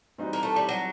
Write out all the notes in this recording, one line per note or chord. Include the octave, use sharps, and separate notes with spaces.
E3 G3 C4 D#4 F#4
A#3
A3
G3
F#3